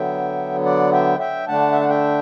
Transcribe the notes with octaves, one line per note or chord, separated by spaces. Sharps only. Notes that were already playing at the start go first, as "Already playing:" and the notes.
Already playing: D3 F#3 B3 E5 G5
D5 F#5
E5 G5
E5 G5
D3 A3 D4 F#5 A5
E5
F#5
E5 G5